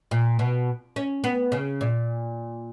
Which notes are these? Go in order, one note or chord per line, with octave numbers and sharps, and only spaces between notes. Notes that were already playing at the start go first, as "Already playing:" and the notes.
A#2
B2
C#4
B3
C#3
A#2